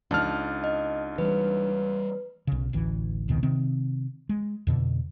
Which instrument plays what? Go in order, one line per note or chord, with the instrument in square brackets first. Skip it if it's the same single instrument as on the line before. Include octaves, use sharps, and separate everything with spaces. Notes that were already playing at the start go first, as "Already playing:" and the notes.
[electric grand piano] C#2 A5 F6 [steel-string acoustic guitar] D4 D#4
[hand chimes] D#5
[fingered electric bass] E3 G3 [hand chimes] B4
[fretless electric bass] B1 C#3
A1 D2 E3
E1 C2 B2 D#3
C3 D#3 C4
G#3
F2 B2 D3